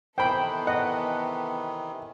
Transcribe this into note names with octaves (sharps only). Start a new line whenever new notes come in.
C3 D#3 E3 B3 A4 C5 G5 B5
D#5 F#5